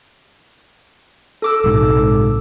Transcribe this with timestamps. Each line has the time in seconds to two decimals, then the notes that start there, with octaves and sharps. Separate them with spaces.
1.42 A4 D6 E6
1.64 A#1 G#2 C3